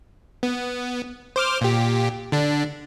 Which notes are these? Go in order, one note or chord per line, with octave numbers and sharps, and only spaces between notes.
B3
C5 D6 F6
A#2 G4
D3 D4